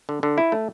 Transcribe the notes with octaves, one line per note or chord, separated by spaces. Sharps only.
D3
D3
E4
A3